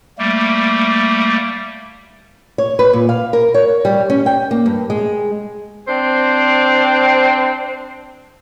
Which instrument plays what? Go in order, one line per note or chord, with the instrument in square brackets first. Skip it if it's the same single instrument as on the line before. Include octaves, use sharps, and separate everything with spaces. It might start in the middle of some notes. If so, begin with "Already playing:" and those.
[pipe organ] G3 A3 A#3
[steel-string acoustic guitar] C#5
B4
A#2
F5
A#4
C#5
G3
C#4
G5
A#3
G2
G#3
[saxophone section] C4 D4 C5